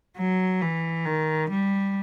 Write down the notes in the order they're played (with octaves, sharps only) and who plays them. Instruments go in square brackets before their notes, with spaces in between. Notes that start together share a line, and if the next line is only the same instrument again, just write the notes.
[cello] F#3
E3
D#3
G3